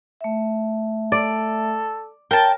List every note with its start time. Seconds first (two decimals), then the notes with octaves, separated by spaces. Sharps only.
0.21 A3 E5
1.12 A4 D5
2.31 A#4 C#5 G5 A5